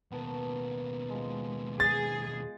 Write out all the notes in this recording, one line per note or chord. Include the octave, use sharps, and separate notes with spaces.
D#2 B2 B3 A4 A#4
F3 G#3
G#4 A6